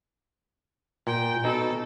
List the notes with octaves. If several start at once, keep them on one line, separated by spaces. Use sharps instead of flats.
A#2 G5
B2 D#4 A4